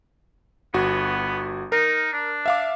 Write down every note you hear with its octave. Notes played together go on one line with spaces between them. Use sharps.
G1 B3 F#4
D#4 A#4
D4
E5 F5 D6